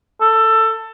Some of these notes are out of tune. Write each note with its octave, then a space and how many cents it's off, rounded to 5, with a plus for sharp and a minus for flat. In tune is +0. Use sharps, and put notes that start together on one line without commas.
A4 +15